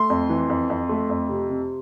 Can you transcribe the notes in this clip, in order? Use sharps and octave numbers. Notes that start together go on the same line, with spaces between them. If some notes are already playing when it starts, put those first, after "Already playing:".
Already playing: A3 C6
F2
E3
F2
F2
A3
F2
C3
C3